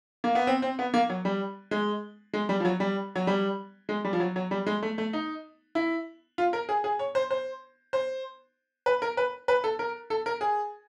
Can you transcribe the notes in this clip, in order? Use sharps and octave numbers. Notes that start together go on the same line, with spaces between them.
A#3
B3
C4
C4
B3
A#3
F#3
G3
G#3
G#3
G3
F3
F#3
G3
F#3
G3
G#3
G3
F3
F#3
F#3
G3
G#3
A3
A3
D#4
E4
F4
A#4
G#4
G#4
C#5
C5
C5
C5
B4
A#4
B4
B4
A4
A#4
A4
A#4
G#4